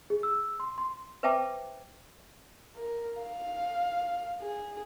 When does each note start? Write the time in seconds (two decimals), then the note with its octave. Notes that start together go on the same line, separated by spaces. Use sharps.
0.10 G#4
0.23 E6
0.60 C6
0.78 C6
1.23 B4 C5 E5 G5 A5 D6
2.76 A#4
3.23 F5
4.42 G#4